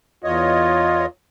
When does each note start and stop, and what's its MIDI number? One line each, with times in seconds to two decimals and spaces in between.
0.24 1.06 40
0.24 1.06 65
0.24 1.06 73
0.24 1.06 75